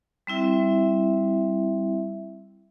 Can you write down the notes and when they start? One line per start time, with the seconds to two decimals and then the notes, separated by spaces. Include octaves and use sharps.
0.27 G3 C4 E4 E5